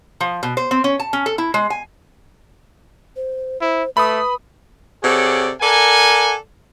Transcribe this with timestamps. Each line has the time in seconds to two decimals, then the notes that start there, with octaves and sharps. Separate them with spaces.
0.20 F3
0.43 B2
0.57 C5
0.71 C4
0.84 C#4
0.99 A5
1.13 C#4
1.26 A4
1.38 E4
1.54 G#3
1.70 G#5
3.16 C5
3.61 E4 C5
3.97 A3 B4 B5 D#6
5.03 C3 G#4 A4 C#5 D5 F#5
5.61 A4 A#4 D5 F#5 G#5